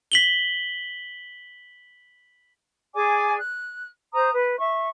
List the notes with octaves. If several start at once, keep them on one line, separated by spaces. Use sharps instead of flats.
B6 F#7 G7
G#4 D5 G#5 D6
F#6
C5 A#5 D#6
B4
E5 C#6